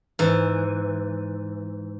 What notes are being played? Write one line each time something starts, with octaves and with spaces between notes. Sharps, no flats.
G#2 E3